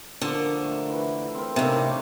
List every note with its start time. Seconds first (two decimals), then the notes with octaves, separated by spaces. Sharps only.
0.21 D3 F3 A#3
0.64 A3
0.90 E3
1.35 C4 A#4
1.56 A2 C3 A#3 D4 D#4